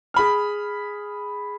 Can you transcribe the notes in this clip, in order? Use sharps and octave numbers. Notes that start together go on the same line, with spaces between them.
G#4 B5 F6